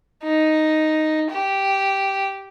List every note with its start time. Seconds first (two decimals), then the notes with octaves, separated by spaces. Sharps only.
0.24 D#4
1.30 G4